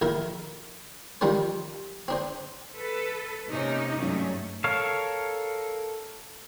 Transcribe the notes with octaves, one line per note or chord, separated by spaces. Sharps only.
A#1 D#3 E4 A#4
D#3 F3 G3 C4 C#4 C5
C4 D4 C5
A4 B4
C3 A#3 C#4 D#4
G2 F#3 A3 C#4 D#4
A4 A#4 C#5 F5